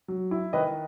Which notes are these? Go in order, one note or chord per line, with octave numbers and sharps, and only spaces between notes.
F#3
E4
D#3 B4 D#5